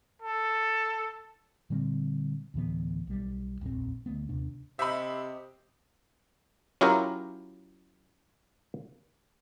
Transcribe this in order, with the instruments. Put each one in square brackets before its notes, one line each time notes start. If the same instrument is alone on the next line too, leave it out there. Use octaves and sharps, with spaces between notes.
[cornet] A4
[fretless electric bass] A#2 D3 G3 C4
D2 A2 E3 B3
B1 G3
D#1 A#1 F2 C4
D2 A3 B3
D#2 C3 D4
[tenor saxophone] C3 [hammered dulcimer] G4 D#5 [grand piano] E5 B5
[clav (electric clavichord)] F#3 C#4 E4 F4 G4 A#4